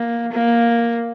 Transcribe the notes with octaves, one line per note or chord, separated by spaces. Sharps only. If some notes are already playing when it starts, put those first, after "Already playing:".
Already playing: A#3
A#3